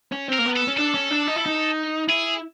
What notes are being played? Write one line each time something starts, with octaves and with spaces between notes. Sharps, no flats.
C#4
C4
A#4
A#3
B3
A4
C#4
D4 A4
C#4
D4
D#4
E4
D#4
E4 G#4